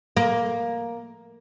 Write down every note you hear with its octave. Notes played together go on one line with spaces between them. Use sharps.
A#3